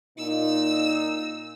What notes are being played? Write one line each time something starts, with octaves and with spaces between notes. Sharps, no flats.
A#2 D#4 E6